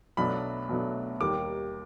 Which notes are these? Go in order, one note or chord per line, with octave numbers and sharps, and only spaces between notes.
B1 B2 F#3 A3 D4 B5
B1 B2 F#3 A3 D4
D#2 D#3 G3 A#3 D6